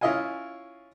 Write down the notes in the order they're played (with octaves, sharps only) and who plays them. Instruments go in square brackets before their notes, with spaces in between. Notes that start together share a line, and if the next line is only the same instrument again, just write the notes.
[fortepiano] C#4 E4 F4 D#5 F5 G#5